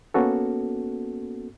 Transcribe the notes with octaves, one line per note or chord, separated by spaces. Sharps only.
A#3 B3 C#4 F#4 A4